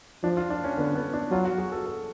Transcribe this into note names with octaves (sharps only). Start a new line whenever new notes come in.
F3 D4
F4
D4
C#4
D3 B3
B3
D4
F#3 F4
F#4
G#4
A4
A4